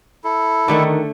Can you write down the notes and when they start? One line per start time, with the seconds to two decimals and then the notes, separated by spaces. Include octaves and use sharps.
0.24 E4 A4
0.68 D3 D#3 A3 F#5